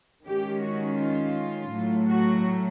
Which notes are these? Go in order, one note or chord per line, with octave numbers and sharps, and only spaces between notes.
D#3 G#3 C#4 G4
F#4
F4
A2 F#3 A3
F#4